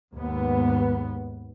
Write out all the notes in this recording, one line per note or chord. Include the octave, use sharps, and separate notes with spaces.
D#2 G#2 B3